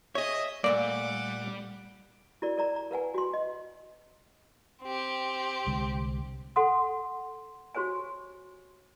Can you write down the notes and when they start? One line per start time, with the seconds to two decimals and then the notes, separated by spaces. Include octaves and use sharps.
0.15 G#4 C#5 D#5 E5
0.64 A#2 G3 A3 A#3 D5 F#5 D6
2.42 E4 F#4 A#4 D5
2.58 A#4 D5 A#5
2.76 A#5
2.91 A#4 B4 F#5 G#5
3.14 F#4 C6
3.34 D#5
4.83 C4 G4
5.67 C2 D3 G#3
6.56 A4 F#5 C6 D#6
7.75 F#4 G4 C5 C#5 G#5